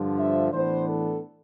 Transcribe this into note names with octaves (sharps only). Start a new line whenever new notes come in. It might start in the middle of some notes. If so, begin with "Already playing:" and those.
Already playing: G2 D3 F3
E5
A2 E3 B3 D4 C5
A4